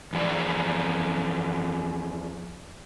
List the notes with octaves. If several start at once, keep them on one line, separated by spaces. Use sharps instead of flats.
E2 F3 D5